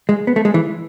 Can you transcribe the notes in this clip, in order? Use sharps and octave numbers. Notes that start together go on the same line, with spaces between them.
G#3
B3
A3
G#3
E3